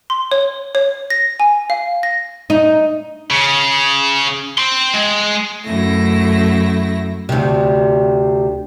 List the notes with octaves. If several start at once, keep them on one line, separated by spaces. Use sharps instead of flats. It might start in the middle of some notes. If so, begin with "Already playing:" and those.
C6
C#5
C#5
A#6
G#5
F5
A#6
D#4
C#3
G5 C6
G#3
F#2 A3 E4 A#6
D2 C3